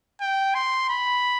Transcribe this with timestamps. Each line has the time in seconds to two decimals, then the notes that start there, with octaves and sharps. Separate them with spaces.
0.21 G5
0.55 C6
0.89 B5